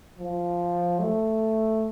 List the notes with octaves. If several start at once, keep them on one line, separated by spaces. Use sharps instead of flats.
F3
A3